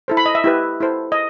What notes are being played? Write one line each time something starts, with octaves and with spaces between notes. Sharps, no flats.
E4 A4 C5
B5
D#5
E5
E4 G4 B4
E4 A4 C5
D#5